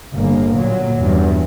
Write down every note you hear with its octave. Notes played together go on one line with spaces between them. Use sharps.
G1 A#3
A#2 F#3
E2 G2